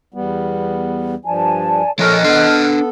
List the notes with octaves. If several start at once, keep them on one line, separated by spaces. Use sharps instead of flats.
E2 G3 B3
G2 F3 D5 G#5 A5
F3 A4 A#4 C#5 D#5 F6 F#6
B3 D4 A4 C6